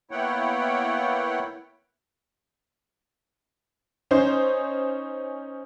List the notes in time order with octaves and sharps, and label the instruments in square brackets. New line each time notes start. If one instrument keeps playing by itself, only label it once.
[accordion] A#3 B3 E4 C#5 F#5 G5
[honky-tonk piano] C#4 D#4 C5